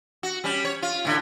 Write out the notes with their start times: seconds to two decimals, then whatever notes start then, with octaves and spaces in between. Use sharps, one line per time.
0.23 F#4
0.44 G3 C#4
0.65 C#5
0.82 F4
1.05 A2 D3